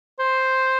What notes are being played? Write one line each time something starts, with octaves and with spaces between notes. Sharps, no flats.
C5